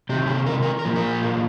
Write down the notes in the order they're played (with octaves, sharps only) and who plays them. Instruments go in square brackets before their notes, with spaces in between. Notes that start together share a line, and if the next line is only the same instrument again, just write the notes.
[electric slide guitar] C3 D#3 G4
G#4
A#4
A#4
A#4
A#2 F3
A#4
G#4